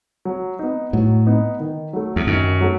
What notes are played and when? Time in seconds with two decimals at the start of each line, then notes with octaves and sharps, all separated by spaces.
0.25 F#3
0.59 B3 D#4
0.93 A2 F#3
1.27 B3 D#4
1.60 D#3
1.93 F#3 A3
2.16 E2
2.27 F#2 D#3
2.61 F#3 A3